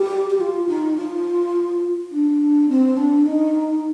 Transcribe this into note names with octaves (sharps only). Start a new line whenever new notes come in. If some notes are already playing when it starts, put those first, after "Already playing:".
Already playing: G4
G4
F4
D#4
F4
D4
C4
D4
D#4